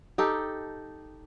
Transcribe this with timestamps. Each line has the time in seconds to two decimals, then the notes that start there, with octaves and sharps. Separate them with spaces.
0.18 D#4 G4 A4